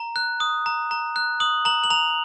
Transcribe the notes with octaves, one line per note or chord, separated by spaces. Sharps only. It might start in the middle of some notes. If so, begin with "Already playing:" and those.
Already playing: A#5
F#6
D#6
A#5
A#5
F#6
D#6 F#7
A#5 F#7
F#7
A#5 F7